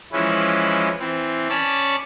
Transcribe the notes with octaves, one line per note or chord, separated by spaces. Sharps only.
E3 F3 G#3 C#4 E4 B4
E3 C4
C#4 C#5 D5 A5 B5